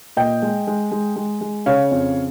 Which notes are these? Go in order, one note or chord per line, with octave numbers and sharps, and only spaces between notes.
A#2 D#5 G5
G#3
G#3
G#3
G#3
G#3
C#3 C#5 F5
F2